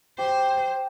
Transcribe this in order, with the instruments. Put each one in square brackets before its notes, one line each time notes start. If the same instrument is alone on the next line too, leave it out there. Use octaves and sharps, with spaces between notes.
[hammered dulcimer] G4 [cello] C5